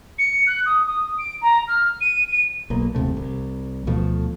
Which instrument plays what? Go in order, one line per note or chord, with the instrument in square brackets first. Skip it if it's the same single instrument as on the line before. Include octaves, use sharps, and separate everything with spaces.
[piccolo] C#7
F#6
D#6
D#6
D7
A#5
F6
D#7
D#7
[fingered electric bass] B1 B2 A#3
F#1 D#2 C3 A3
C2
D2 B2 F3 A3